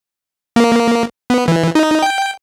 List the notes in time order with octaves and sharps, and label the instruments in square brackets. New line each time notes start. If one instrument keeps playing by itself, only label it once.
[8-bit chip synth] A#3
B3
E3
D#4
G5